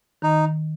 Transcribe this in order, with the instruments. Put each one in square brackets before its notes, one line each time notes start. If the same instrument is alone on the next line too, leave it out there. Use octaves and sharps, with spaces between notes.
[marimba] D#3 [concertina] D#4